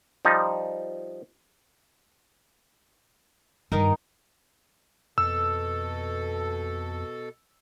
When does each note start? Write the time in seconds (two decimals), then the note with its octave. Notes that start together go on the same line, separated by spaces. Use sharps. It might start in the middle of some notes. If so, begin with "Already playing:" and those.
0.25 F3 G3 D#4
3.72 G2 D#3 D#4 A#4
5.18 F2 B2 A4 E6